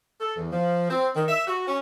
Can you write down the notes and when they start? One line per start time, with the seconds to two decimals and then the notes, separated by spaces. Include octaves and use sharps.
0.20 A4
0.36 E2
0.51 F3
0.89 C4
1.16 D#3
1.28 E5
1.47 F#4
1.67 C#4